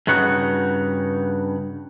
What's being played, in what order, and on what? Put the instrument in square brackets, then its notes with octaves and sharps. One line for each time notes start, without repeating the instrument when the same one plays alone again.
[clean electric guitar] G2 C#3 D#4 F#4 F#5